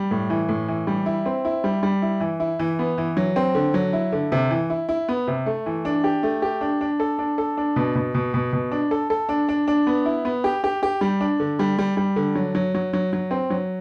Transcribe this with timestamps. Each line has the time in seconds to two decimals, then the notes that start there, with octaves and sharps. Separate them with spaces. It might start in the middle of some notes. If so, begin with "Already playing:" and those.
Already playing: G3
0.11 A2
0.30 E3
0.49 A2
0.68 E3
0.87 G3
1.06 E4
1.26 C4
1.45 E4
1.64 G3
1.83 G3
2.02 E4
2.20 E3
2.40 E4
2.59 E3
2.79 B3
2.98 E3
3.17 F#3
3.36 C4
3.55 D3
3.74 F#3
3.93 E4
4.12 D3
4.32 C3
4.51 E3
4.70 E4
4.89 E4
5.09 B3
5.28 C3
5.46 A3
5.66 E3
5.85 D4
6.04 G4
6.23 A3
6.42 G4
6.61 D4
6.81 D4
7.00 A4
7.19 D4
7.38 A4
7.57 D4
7.76 B2
7.95 B2
8.15 B2
8.34 B2
8.53 B2
8.72 D4
8.91 A4
9.10 A4
9.29 D4
9.49 D4
9.68 D4
9.87 B3
10.06 E4
10.25 B3
10.44 G4
10.64 G4
10.83 G4
11.01 G3
11.21 D4
11.40 D3
11.59 G3
11.78 G3
11.97 G3
12.16 D3
12.35 F#3
12.55 F#3
12.74 F#3
12.93 F#3
13.13 F#3
13.31 C4
13.50 F#3